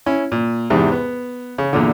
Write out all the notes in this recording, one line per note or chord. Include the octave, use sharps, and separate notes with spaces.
C#4 E4
A#2
E2 G#2 C3
B3
C#3
E2 A#2 D3